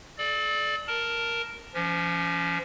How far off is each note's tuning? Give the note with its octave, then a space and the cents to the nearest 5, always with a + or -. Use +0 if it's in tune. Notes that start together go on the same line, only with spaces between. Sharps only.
A4 -40 D5 +10
A#4 +0 A5 +5
F3 -35 C#4 +20